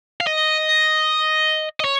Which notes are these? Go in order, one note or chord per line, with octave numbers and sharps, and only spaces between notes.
F5
D#5
D#5
C#5